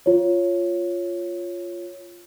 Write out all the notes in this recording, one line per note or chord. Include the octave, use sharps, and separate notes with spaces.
F4 C#5